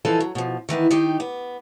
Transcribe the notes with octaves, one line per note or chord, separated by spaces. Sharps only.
E3 F3 A4 D#5 F5 G#5
F#3
B2 F3
D#3 E3 B3 E4
D#3 D#4 G4
B3